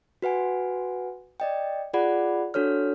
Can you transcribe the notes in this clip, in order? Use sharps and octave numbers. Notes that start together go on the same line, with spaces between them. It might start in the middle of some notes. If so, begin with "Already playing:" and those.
F#4 B4 F#5 G#5
D5 D#5 G5
F4 G#4 D5 F#5 B5
D4 F#4 A4 C#5 F6